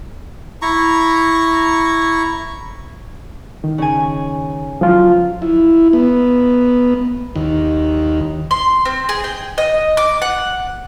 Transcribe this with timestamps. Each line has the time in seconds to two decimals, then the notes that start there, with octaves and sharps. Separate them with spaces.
0.62 E4 A#5 C#6
3.64 D#3
3.78 C#3 G#5
4.81 F3 F#3 F4
5.42 E4
5.93 B3
7.36 D#2
8.51 C6
8.85 C4
9.09 G#4
9.24 G5
9.58 D#5
9.97 D6
10.22 F#5